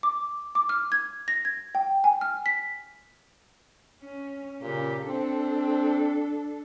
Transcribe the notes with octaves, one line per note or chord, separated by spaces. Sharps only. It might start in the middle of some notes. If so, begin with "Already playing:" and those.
D6
D6
F6
G#6
A#6
G#6
G5
G#5
F6
B6
C#4
A#2 C#3 G4
C4 D4 A4